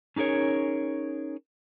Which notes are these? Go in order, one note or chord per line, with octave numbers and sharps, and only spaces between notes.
C#4 D#4 G#4 A#4 C#5